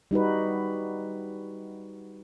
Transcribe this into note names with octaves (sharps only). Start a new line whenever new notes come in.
G3 D#4 F#4 B4